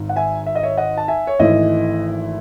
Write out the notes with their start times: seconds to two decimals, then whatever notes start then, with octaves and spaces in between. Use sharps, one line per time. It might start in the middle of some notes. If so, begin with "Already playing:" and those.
Already playing: G#1 G#2 D#3
0.09 F#5
0.16 E5 G#5
0.46 E5
0.55 D#5
0.63 C#5 E5
0.78 D#5 F#5
0.97 A5
1.08 E5 G#5
1.27 C#5
1.39 G#1 G#2 E3 A3 E4 D#5